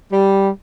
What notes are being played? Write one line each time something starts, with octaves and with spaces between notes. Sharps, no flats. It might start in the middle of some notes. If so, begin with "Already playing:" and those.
G3